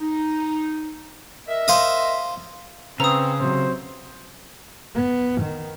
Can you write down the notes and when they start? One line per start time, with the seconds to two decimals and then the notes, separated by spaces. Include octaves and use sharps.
0.01 D#4
1.48 A#4 D#5 E5
1.68 C5 F5 D#6
3.00 C#3 C4 B4 A#5 D#6 E6
3.40 C3 F#3 C5
4.95 B3
5.42 D#3